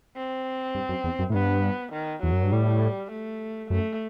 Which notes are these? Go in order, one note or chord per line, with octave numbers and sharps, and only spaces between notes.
C4
G2
F#2
E2
F#2
A2
G2 B3
D#3
E2 F#3
F#2
G2
A2 G3
A3
F#2 A3